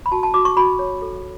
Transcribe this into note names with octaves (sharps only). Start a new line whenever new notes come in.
B5
F#4 A5
A5
F#4 D6
C#6
F#4 B5
C#5
A4